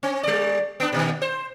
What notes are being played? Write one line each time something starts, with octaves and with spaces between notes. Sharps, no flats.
C4
G3 D5
B3 D4
A#2 D3 D#3
C5